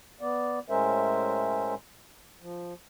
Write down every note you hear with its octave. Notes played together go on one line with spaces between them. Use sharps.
B3 D5
A2 G#3 C#4 A#4 C5 E5
F3